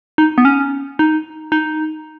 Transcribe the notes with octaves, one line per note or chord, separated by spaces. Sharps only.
D#4
B3
C#4
D#4
D#4